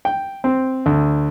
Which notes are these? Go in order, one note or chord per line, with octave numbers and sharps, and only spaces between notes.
G5
C4
D2